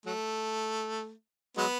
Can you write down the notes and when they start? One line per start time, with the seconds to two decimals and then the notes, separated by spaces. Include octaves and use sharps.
0.06 F#3 A3
1.57 F#3 G#3 B3